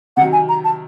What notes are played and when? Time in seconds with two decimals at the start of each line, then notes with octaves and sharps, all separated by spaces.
0.17 C3 D#3 F#3 F#5
0.33 G#5
0.49 A#5
0.64 A5